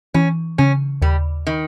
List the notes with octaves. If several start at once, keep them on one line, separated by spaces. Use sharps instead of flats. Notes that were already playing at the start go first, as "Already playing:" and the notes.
E3 C#4
C#3 C#4
D#2 G3
D#3